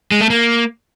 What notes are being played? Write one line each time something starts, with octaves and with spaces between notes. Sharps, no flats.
G#3
A3
A#3